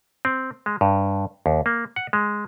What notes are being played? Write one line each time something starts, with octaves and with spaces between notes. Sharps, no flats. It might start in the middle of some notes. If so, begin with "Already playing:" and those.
C4
G#3
G2
D#2
A#3
F#5
G#3